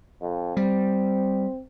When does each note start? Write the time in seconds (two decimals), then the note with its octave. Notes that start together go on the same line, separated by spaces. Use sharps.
0.21 F2
0.57 G3 C4